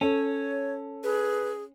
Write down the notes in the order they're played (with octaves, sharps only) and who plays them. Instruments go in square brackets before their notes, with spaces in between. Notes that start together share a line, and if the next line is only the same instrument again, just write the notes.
[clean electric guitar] C#4 [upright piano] A4 [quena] C#5
[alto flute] G#4 [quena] B4